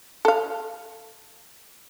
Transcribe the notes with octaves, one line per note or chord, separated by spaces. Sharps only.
A4 F5